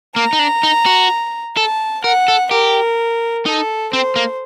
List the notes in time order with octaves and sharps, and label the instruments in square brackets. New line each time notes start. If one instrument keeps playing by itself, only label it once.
[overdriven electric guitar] A#3 [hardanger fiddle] A#5
[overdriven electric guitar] D#4
D4
D#4
F#4
[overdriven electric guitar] A4 [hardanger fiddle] A5
[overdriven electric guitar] A#4 [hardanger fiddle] F#5
[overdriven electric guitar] A4
[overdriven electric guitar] G4 [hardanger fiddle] A#4
[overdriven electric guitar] D#4 [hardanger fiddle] A4
[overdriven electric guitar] C4 [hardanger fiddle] C5
[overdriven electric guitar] A#3